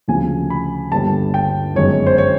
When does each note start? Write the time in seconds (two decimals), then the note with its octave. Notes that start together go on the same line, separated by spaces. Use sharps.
0.08 D2 C#3 F3 G#5
0.50 B5
0.92 G1 G2 D3 G3 A#3 A5
1.34 G5
1.75 G1 F#2 D#3 G#3 C#5
2.07 C5
2.18 C#5